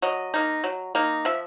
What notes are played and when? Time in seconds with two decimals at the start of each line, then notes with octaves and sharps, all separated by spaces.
0.02 F#3 D#5
0.34 A#3 D#4
0.64 F#3
0.95 A#3 D#4
1.25 F3 E5